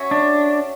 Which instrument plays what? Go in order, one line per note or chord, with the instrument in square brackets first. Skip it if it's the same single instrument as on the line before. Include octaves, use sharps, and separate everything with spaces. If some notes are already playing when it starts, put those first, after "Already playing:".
Already playing: [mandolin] C#4 F#4 C#5 E5
[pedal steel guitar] D4